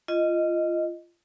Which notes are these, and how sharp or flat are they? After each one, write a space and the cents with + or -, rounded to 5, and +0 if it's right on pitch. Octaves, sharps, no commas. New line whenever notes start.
F4 -20 D#5 +0